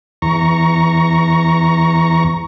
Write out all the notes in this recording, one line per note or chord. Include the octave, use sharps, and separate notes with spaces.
E2 A#5 C#6